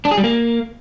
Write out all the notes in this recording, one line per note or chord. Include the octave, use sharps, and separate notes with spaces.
D4
G#4
G3
A#3